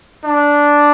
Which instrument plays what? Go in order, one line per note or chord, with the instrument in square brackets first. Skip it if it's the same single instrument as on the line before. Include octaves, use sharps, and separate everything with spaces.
[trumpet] D4